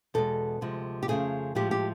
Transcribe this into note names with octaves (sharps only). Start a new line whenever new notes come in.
E2 B2 G#3 A4
D2 C3 F3 G#3
G4
F2 C#3 F3 A3 G#4
A2 F3 G#3 G4
G4